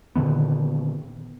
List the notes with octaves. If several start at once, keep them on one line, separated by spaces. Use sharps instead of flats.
A#2 D3 D#3 B3